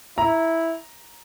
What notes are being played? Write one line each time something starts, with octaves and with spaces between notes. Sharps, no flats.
E4 A#5